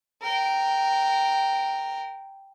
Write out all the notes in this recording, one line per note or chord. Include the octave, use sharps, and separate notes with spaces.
A#4 G5